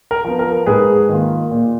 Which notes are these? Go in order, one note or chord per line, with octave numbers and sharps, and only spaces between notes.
A#4
F3 B3
A#4
G#2 G#4 B4
D#3 A#3 F4
A#2